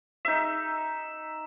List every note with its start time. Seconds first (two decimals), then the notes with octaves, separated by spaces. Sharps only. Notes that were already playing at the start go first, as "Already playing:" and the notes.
0.25 D#4 E5